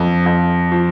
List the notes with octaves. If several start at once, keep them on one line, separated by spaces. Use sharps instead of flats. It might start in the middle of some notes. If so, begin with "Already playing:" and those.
Already playing: F2
F2
F3